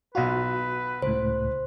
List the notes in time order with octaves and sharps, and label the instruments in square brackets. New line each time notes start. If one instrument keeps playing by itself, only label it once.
[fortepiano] B1 F4 F5 [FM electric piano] F#4 [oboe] B4
[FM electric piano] C#2 A2 [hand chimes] C5